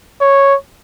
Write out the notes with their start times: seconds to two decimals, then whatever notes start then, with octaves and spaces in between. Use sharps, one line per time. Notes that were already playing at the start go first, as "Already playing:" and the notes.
0.21 C#5